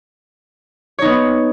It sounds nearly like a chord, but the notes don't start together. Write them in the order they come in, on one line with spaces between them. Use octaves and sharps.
C#5 D#4 B3